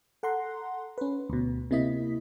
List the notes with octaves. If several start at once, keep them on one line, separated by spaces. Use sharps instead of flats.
A4 F#5 A#5 C6
C#4 B4
D2 B2
C3 A#3 E4 D#5 B6